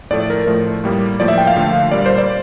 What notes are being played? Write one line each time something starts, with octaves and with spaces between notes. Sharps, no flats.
A2 F3 A3 D5
A#4
A2 F3 A3
A2 G3 A#3
A2 F3 A#3 D5
E5
G5
F5
D3 F3 A3
A#2 G3 A#3 D5
C5
D5